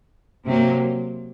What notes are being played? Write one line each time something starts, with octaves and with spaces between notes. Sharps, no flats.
C3 F#3 A#3